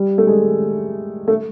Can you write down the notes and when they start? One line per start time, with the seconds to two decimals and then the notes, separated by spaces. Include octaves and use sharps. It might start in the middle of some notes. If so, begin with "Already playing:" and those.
Already playing: G3
0.18 A3
0.27 G#3
1.28 A3